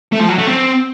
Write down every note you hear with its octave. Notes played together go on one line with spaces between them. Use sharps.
A3
F3
F#3
A3
C4